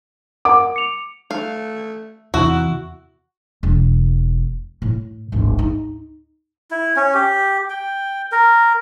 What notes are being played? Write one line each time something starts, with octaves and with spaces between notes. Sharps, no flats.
A#4 F#5 D6
C#7 F7
A3 F5
E2 C3 E4 F#4
E1
A2
D1 G#1
D#4
E4
C#4
G4
G5
A#4